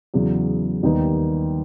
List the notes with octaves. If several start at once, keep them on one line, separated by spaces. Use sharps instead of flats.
E2 C#3 F#3
D#2 D#3 G3 B3 D#4